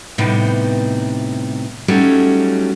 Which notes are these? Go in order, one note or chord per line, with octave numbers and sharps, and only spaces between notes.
A2 C3 G3 B3 D#4
F#3 G3 A3 C#4 D#4 F#4